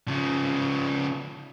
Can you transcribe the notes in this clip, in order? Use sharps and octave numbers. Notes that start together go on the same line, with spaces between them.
C#3 F3